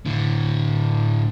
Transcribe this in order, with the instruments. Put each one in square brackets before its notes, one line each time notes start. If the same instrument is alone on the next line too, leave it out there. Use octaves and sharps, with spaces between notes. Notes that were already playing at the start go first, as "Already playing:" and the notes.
[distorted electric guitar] A2 D3